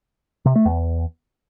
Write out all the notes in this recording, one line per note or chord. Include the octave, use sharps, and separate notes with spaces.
C3
A3
E2